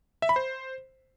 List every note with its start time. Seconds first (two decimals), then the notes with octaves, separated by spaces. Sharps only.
0.22 E5
0.29 B5
0.36 C5